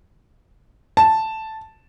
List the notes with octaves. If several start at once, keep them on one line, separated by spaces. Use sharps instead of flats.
A5